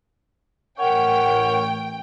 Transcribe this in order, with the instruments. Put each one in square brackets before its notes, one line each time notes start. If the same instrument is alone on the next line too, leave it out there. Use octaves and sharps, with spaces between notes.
[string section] A1 G5 [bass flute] A#4 [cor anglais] C#5 [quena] F#5